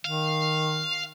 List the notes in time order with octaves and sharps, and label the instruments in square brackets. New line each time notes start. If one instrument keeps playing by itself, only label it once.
[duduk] D#3 [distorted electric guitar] F5